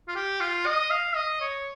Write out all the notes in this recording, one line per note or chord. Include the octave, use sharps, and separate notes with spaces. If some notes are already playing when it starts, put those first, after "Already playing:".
F4
G4
F4
D#5
F5
D#5
C#5